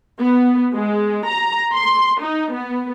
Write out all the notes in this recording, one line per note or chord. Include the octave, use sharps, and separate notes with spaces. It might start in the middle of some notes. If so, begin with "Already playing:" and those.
B3
G#3
A#5
C6
D#4
B3